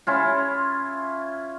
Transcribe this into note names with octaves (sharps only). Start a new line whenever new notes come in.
C#4 E4 F4